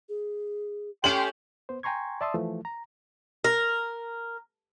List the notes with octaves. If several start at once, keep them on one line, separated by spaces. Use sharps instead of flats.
G#4
A3 C#4 G4 G5 C6 F#7
B3 C5
G5 G#5 A#5 C6 C#6 G#6
D5 E5 A5 C6 D#6 E6
E3 F3 A3
A#5
A#4